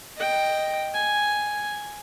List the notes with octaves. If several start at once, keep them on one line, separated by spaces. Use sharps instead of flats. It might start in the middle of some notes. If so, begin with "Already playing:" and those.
D#5 G5
G#5